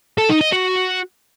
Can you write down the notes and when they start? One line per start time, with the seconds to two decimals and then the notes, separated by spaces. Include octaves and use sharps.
0.18 A4
0.29 D#4
0.41 D#5
0.52 F#4